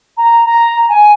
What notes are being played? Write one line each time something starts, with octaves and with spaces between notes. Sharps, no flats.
A#5
A#5
G#5